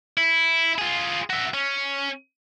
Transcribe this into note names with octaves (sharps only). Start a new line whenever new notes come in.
E4
F4 G#4
F#4 E5
C#4